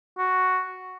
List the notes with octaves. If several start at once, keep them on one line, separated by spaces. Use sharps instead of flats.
F#4